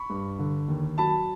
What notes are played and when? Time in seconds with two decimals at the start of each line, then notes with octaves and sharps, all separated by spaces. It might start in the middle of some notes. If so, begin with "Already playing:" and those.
Already playing: B5 C#6
0.10 G2
0.39 D3
0.68 D#2
0.98 F#3 A5 B5